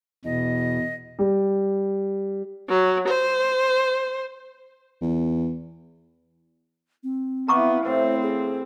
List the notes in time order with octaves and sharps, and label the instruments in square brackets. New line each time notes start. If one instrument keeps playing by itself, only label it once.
[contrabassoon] E2 [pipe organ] B2 [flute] D#5
[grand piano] G3
[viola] F#3
C5
[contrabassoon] E2
[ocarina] C4
[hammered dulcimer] E3 F5 [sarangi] B3 [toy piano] A#5 C#6 D6
[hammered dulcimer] A2 A4 [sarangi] C4 [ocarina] C5
[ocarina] G#4